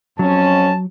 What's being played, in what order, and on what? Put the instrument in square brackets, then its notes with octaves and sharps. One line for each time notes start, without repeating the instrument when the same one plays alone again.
[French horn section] F2 C#4 [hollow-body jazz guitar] F#3 [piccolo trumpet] A5